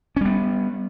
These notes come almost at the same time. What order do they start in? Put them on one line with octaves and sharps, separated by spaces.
C#4 G3 B3